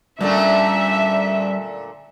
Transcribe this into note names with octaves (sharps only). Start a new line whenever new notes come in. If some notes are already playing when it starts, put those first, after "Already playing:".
A#2 D3 G3 A3 C#4 E5